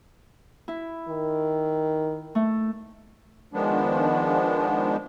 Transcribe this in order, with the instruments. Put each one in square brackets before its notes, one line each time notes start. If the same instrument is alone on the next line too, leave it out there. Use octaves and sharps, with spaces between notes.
[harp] E4
[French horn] D#3
[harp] A3
[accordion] D#3 F3 G#3 B3 D4